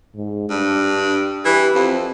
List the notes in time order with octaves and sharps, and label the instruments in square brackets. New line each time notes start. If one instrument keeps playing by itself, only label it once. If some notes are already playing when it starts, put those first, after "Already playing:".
[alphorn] G#2
[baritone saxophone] G2 [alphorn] D4
[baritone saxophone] E3 [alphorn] G4
[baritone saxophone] F2 [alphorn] C4